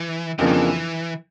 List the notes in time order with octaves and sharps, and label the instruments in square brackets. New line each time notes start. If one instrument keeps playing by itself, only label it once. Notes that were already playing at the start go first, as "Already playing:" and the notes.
Already playing: [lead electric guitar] E3
[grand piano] F2 C#3 F3 A#3 D4 [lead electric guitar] E3
[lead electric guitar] D#3
E3